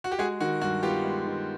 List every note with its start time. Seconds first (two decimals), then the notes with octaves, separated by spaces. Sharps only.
0.04 F#4
0.12 G4
0.19 G#3 F#4 G#4
0.40 D#3 F#4
0.61 G2 F#4
0.83 B3 F4 G4
1.05 G#3
1.26 D#3